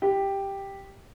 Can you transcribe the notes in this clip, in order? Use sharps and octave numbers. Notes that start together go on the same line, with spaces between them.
G4